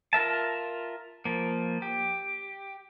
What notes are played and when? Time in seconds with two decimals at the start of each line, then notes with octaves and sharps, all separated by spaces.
0.13 F4 A#4 E5 A5
1.25 F3 A#3
1.82 G4